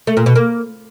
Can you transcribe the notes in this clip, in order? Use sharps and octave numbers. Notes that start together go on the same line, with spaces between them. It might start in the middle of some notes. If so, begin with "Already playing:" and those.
A3
A#2
B2
A#3